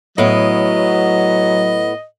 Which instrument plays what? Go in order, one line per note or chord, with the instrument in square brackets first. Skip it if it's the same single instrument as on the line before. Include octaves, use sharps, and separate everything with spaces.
[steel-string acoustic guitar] A2 B3 [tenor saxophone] F#3 [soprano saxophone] D#5